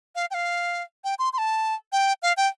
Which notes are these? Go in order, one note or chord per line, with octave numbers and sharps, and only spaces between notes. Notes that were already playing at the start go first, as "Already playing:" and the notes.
F5
G5
F5
G5
C6
C6
A5
G5
F5
G5